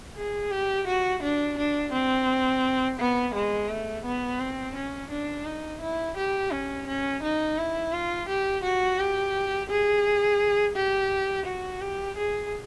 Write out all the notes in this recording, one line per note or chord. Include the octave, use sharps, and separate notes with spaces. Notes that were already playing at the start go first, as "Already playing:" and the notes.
G#4
G4
F#4
D4
D4
C4
B3
G#3
A3
B3
C4
C#4
D4
D#4
E4
G4
C#4
C#4
D#4
E4
F4
G4
F#4
G4
G#4
G4
F#4
G4
G#4